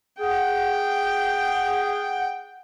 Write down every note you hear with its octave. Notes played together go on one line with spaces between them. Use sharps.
G#4 F#5 G5